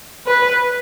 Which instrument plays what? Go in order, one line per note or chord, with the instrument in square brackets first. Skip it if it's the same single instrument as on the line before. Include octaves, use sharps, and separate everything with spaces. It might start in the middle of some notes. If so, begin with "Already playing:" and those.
[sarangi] B4